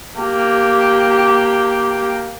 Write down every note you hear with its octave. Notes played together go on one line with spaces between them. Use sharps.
A#3 G4